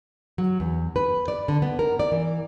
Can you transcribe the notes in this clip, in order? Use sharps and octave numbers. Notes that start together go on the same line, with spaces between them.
F#3
E2
B4
D5
D3
B3
A#4
D5
E3